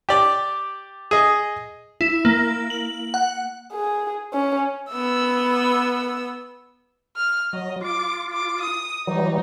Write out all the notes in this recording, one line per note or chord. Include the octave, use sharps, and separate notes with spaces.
G4 D5
G#4 D#5
E4
A#3
F#7
F#5
G#4
C#4
B3 E6
F6
F#3 D#5
F4 D6
D6
D#6
E3 F#3 G3 D#4